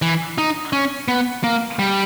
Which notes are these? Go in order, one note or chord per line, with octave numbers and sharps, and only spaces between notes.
E3
D#4
C#4
B3
A#3
G3